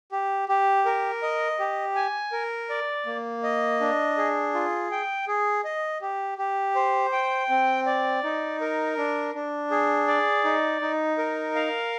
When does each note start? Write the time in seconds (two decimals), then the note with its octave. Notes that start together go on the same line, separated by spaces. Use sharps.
0.12 G4
0.49 G4
0.86 A#4
1.22 D#5
1.59 G4
1.95 G#5
2.32 A#4
2.70 D5
3.06 A#3
3.43 D#5
3.81 D4
4.17 G#4
4.54 F4
4.91 G5
5.28 G#4
5.64 D#5
6.01 G4
6.38 G4
6.75 C5
7.12 G5
7.49 C4
7.86 D5
8.24 D#4
8.61 A#4
8.98 D4
9.34 D4
9.71 G#4
10.08 D5
10.44 D#4
10.81 D#4
11.18 A#4
11.55 F5